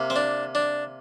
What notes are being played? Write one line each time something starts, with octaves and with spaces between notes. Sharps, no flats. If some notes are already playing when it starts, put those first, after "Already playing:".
Already playing: C3 A#3
C4
D4
D4